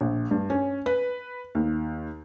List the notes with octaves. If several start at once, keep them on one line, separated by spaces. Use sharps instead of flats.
A#1
G2
C#4
B4
D#2